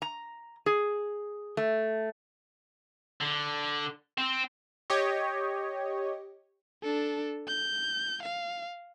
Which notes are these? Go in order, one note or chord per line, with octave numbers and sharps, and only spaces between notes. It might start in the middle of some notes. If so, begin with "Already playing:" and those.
A#5
G#4
A3
D3
C4
G4 C#5 D#5
D4 A4
G6
F5